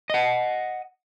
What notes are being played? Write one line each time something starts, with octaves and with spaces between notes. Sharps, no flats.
D#5 F#5